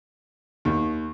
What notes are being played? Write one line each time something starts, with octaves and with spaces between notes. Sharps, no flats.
D#2